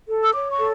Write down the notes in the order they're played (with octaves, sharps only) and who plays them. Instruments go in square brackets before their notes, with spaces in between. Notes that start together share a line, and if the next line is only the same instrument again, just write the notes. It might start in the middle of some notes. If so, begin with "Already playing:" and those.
[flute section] A4
E6
C#5 D6
C#6
A4